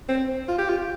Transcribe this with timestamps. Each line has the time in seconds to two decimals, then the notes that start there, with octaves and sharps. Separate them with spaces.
0.09 C4
0.48 F4
0.58 G4
0.69 F4